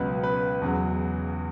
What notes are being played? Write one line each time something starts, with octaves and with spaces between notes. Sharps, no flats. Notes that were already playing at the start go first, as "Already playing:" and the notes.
Already playing: C#2 B2 F#3 B4
B4
E2 C#3 F#3